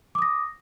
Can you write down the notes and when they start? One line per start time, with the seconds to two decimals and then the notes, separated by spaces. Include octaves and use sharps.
0.15 D6
0.19 D#6
0.22 A#6